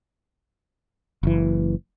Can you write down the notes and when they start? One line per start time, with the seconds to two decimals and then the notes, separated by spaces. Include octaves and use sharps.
1.23 F#1 E3